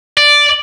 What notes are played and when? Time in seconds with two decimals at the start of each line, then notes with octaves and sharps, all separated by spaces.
0.18 D5